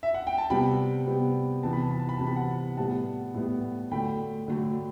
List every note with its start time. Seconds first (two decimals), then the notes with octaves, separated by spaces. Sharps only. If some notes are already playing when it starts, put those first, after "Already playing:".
0.03 E5
0.14 F#5
0.27 G5
0.38 A5
0.50 C3 G3 B3 G5 B5
1.07 C3 G3 B3
1.63 C3 E3 B3 A5
1.73 B5
1.82 A5
1.91 B5
2.00 A5
2.09 B5
2.17 C3 E3 B3 A5
2.27 B5
2.36 F#5 A5
2.77 A2 G3 B3 F#5 A5
3.34 A2 G3 B3
3.91 D3 F#3 A3 G5 B5
4.48 D3 F#3 A3